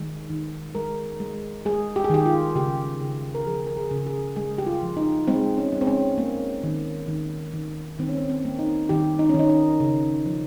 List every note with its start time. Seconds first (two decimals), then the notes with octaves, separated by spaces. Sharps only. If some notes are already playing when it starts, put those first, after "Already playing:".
Already playing: D#3 G#3
0.30 D#3
0.75 G#3 A#4
1.20 G#3
1.65 G#3 G#4
1.96 G4
2.04 G#4
2.10 D#3 G4
2.26 F4
2.55 C#3 G4
3.00 C#3
3.35 A#4
3.46 F3 G#4
3.67 A#4
3.77 G#4
3.91 C#3
4.07 G#4
4.36 G#3 G#4
4.58 G4
4.66 F4
4.83 F3
4.97 D#4
5.27 G#3 C4
5.58 C#4
5.72 G#3
5.81 C4
5.87 C#4
6.18 A#3
6.64 D#3
7.08 D#3
7.54 D#3
7.99 D#3 C4
8.09 C#4
8.17 C4
8.29 C4
8.45 A#3
8.59 D#4
8.89 D#3 G4
9.19 D#4
9.29 C#4
9.34 D#3 D#4
9.50 D#4
9.80 C#3
10.26 F3